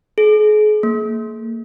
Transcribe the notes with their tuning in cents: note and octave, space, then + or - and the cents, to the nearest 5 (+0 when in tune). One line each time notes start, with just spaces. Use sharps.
G#4 +40
A#3 -35